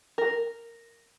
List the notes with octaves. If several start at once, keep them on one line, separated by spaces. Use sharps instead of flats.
A#4